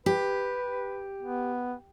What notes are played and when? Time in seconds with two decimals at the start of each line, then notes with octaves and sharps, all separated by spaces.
0.06 G4 B4
1.23 B3